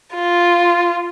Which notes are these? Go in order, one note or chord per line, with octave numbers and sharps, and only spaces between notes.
F4